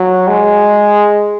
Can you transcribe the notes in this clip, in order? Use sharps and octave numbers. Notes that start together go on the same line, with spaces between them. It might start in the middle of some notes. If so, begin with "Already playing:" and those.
Already playing: F#3
G#3